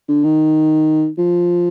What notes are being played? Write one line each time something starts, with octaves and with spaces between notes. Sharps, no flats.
D3
D#3
F3